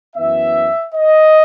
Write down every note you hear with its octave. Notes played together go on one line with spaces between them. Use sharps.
F#2 E3 B3 E5
D#5